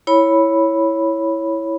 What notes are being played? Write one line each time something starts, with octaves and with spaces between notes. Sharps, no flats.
E4 C#5 B5